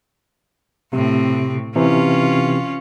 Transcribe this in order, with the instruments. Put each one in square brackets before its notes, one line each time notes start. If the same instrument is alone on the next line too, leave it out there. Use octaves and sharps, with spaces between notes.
[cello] A2 C4 [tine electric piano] C3
[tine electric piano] C3 E3 [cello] C#4 F4